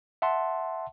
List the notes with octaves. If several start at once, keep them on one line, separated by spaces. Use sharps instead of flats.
E5 F#5 A5 C6